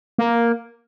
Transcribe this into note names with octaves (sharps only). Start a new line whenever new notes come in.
A#3